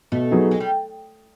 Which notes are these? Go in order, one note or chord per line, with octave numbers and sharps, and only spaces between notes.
B2 A3
F#3 B3 D#4 G#4
G#3
G3